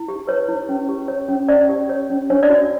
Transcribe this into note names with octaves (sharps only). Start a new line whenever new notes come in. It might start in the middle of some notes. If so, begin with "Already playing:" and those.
Already playing: E4
G4
B4 C#5
E4
C#4
G4
C#5
C#4
C#4 D5
G4
C#5
C#4
D4 C#5
D5
F#4